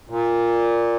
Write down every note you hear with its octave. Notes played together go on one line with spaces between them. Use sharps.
A#2